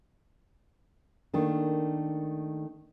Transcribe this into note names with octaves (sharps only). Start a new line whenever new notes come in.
D#3 A3 A#3 D4